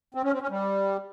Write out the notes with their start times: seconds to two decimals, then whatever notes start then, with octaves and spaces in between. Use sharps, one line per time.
0.15 C4
0.24 C#4
0.32 C4
0.41 C#4
0.50 G3